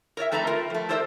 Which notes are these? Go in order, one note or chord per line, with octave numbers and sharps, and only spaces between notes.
A#4 C#5 D5 E5
F2 A3 A4 B4 A5 A#5
F4 A#4
F3 A3
G4 A4 A#4 C5 D5 E5